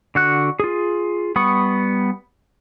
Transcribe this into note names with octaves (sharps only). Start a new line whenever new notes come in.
D3 F#4 F#6
F4 G#4
G3 B3 B5 C#6 D#6